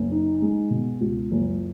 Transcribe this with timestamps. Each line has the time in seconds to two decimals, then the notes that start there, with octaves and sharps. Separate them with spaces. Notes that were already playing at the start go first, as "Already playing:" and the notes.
Already playing: F#1
0.11 D#4
0.42 G#3
0.71 B2
1.01 C#2
1.31 F#1